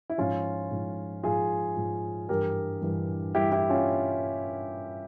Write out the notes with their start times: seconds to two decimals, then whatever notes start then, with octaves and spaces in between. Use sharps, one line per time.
0.10 E4
0.18 G#2 F3 C#4 F4
0.71 G#2 F3
1.23 G#2 F3 F4 G#4
1.77 G#2 F3
2.29 G2 E3 G3 G4 A#4
2.81 G2 E3 G3
3.34 G2 E3 G3 E4 G4
3.52 E4 G4
3.70 C#4 F4